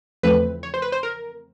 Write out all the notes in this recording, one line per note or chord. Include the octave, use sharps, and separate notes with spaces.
E2 C#3 F3 A3 C4 B4
C#5
C5
B4
C5
A#4